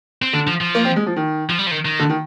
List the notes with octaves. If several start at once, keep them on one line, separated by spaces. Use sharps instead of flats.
C4
D3 D4
F3
F3
A#3
C4
G#3
F3
D#3
F3
G3
F3
D#3
D#3
D3
D#3